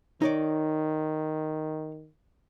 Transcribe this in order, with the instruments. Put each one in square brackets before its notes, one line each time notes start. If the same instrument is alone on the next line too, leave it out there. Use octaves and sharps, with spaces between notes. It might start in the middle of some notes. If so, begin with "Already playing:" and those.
[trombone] D#3 [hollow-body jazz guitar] D#4 C#5 D5